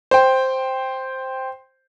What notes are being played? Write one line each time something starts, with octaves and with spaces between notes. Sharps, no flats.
C5 G5